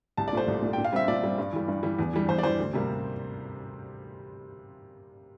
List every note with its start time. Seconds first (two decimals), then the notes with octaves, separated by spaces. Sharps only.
0.17 C2 A5
0.28 D5
0.33 A#2 A3 C5
0.48 C2
0.62 A#2 A3
0.73 A#2 G5
0.84 F5
0.93 G3 C4 E5
1.08 A#2 D5
1.23 G3 C4
1.38 G2
1.52 E3 G3
1.68 G2
1.83 E3 G3
1.99 E2
2.13 E3 G3
2.28 E2 C5
2.38 D5
2.43 E3 G3 C5
2.59 D2
2.73 C3 G3 A#3